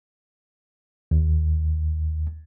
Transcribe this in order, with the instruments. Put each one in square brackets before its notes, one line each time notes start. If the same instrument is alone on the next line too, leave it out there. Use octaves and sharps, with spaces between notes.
[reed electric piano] D#2